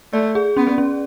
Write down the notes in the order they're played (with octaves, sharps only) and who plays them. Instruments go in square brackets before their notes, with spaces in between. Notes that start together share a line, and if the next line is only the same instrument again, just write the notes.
[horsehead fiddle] A3 [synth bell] D5
[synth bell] G#4
[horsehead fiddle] B3 [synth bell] C#4
[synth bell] C#4